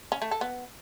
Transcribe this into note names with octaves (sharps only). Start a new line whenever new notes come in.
C#4
A3
A4
B3